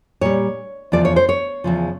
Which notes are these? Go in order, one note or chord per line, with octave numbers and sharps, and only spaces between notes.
A#2 G3 C#5
E2 C#3 F3 D5
C#5
C5
C#5
E2 C#3 F3